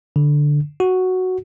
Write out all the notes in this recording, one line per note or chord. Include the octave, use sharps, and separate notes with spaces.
D3
F#4